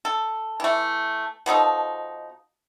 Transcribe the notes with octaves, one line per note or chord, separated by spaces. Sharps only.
A4
E3 A3
B2 F3 D#4 A4